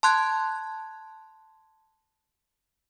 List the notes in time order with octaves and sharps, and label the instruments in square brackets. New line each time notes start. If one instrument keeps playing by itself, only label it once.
[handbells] A5 C6 F#6 G#6